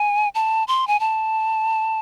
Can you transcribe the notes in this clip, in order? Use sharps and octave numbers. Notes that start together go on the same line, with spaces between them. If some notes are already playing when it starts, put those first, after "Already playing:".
Already playing: G#5
A5
C6
G#5
A5